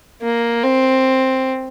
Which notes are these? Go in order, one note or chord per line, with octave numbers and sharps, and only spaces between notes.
A#3
C4